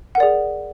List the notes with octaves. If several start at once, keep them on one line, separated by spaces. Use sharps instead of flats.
G#4 A#4 D5 F#5